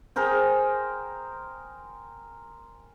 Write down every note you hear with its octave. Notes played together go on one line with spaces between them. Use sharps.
G#4 A#4 C5 G5